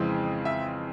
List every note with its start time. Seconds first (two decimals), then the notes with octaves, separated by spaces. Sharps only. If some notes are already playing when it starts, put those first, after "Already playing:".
Already playing: F2 C#3 E3 G#3 C4
0.45 E5